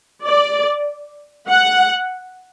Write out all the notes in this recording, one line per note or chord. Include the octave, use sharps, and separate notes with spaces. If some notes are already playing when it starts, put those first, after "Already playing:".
D5
F#5